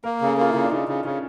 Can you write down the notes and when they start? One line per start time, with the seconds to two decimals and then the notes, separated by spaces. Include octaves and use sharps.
0.04 A#3 A#4
0.21 C#3
0.26 A4
0.37 A#3 F4
0.49 E4
0.54 C#3
0.63 D4
0.71 C#3 D#4
0.88 C#3
1.05 C#3 C#4